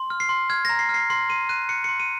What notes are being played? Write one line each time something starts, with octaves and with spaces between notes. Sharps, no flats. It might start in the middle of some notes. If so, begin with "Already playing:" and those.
Already playing: C6
F6
C7
C6
F6 G#6
A#5 A#6
C7
F6
C7
C6 C7
C6 D#7
F#6 D#7
F#6 C#7
C6 C#7
D#7